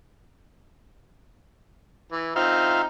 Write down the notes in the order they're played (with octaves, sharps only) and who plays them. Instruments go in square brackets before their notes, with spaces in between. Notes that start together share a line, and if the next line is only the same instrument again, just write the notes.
[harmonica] E3
[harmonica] C4 D#4 [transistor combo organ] F4 E5 F5